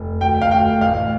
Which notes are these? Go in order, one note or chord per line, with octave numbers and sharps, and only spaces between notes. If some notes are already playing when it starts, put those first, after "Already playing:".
Already playing: F1
D2 G5
F5
D2 G5
A1 F5